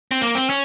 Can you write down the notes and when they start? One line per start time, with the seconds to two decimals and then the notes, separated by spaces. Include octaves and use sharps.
0.11 C4
0.21 A#3
0.35 C4
0.50 C#4